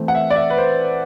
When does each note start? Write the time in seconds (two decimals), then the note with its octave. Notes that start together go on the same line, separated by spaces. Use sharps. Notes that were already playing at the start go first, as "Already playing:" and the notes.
Already playing: E3 A3 C4
0.08 F#5
0.15 E5
0.30 D5
0.36 E5
0.50 B4
0.58 C5